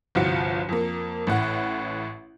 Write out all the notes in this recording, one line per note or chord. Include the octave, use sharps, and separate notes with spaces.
G1 C2 F3 F4 F#4 C#7
F2 A#3
A1 A2 F#5